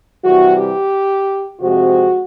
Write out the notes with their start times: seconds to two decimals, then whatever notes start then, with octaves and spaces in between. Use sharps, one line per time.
0.23 C3 E3 G3 F#4
0.57 G4
1.60 F2 C3 F3 G#3 F#4